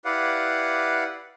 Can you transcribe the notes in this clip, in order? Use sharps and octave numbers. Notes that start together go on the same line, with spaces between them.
E4 G4 B4 D5 F5 F#5